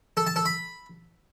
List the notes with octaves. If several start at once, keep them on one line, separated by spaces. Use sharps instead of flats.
A4
A5
A4
B5